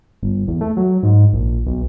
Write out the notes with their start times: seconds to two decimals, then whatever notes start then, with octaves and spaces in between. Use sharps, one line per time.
0.23 G1
0.48 E2
0.61 A3
0.77 F#3
1.03 G#2
1.33 A#1
1.66 B1